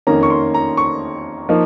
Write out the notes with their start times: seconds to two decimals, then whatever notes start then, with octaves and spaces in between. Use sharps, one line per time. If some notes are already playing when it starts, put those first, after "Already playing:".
0.07 F2 D#3 A#3 C#4 A#5
0.23 C#6
0.30 C6
0.54 A#5
0.77 C#6
1.49 F3 A#3 D#4